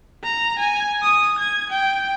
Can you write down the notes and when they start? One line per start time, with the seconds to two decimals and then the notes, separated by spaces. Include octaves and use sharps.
0.24 A#5
0.59 G#5
1.02 D#6
1.39 G#6
1.70 G5